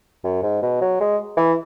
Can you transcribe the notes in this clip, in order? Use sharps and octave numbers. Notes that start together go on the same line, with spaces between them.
F#2
G#2
B2
F#3
G#3
E3